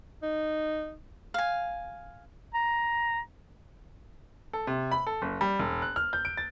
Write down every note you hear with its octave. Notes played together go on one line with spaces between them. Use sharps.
D#4
F5 G#5
A#5
A4
C3
B5
A4
F#1
G3
E1
F#6
F6
G6
D7
A6